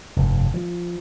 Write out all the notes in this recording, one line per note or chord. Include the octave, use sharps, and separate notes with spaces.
F1 G2
F3